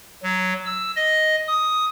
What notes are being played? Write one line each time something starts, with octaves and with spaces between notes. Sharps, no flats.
F#3
E6
D#5
D#6